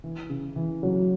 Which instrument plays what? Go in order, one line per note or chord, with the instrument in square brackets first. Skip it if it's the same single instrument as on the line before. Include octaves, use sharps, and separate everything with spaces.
[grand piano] E3
C#3
E3
[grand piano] C#3 [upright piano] F#3